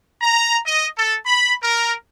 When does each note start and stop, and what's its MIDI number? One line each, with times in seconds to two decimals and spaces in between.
0.22 0.58 82
0.65 0.86 75
0.96 1.15 69
1.25 1.53 83
1.62 1.92 70